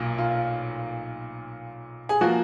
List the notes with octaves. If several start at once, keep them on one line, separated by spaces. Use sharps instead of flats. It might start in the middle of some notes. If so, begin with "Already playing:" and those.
Already playing: B1 A#2 A#3
F4
G#4
F3 A#3 F#4